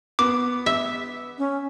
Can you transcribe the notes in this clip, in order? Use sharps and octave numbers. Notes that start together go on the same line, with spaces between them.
B3 D6
E5
C#4